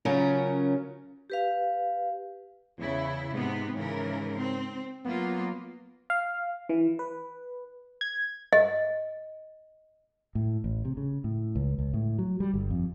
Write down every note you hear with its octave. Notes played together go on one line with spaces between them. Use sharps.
C#3 F#3 C#4 F4 A#4
G4 B4 F5
E2 C#3 E4
G#2 C3 B3 C4
G#2 C#3 E3 A#4
C4
F#3 A#3 B3 F4
F5
E3
B4
G#6
D#5
A2
A1
C3
C#3
A2
C#2
C#2
A2
F#3
G3
G1
F2